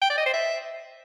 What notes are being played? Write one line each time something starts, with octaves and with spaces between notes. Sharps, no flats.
G5
D5
D#5
C5
E5